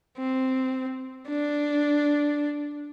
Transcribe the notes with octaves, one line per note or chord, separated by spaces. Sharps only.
C4
D4